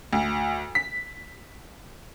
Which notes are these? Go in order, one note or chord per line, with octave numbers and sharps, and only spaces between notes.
D2
B6